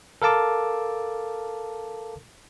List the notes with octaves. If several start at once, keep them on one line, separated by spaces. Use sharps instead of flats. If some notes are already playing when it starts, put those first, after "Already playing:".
A4 A#4 F5 A5 D6